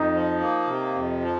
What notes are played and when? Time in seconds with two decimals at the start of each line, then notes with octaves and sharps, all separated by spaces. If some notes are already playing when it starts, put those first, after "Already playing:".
Already playing: F2 D#4
0.13 F3
0.41 A#3
0.67 C3
0.95 F2
1.22 F3